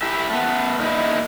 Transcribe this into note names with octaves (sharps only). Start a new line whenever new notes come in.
E4 G4 E5
A3 B3
A#2 D#4 E4